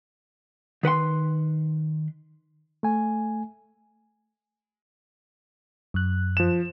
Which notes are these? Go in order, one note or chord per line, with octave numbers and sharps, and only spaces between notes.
D#3 B4 F#5 C6
A3 G#5
F#2 F#6
F3 E7